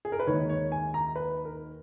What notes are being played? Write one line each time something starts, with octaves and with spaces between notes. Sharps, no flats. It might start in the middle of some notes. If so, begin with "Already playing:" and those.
G#4
A#4
B4
D#2 D#3 G#3 C#5
C#5
G#5
A#5
B4
A#4